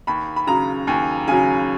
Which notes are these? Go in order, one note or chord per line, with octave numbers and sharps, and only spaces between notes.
D#2 B5
B5
C#3 F#3 A#5
D#2 G#5
C#3 F#3 G#5